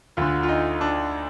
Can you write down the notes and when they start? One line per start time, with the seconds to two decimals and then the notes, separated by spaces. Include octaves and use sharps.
0.17 D2 D3 F4
0.43 F4
0.49 D#4
0.81 D4